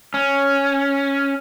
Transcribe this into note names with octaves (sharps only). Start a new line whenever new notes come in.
C#4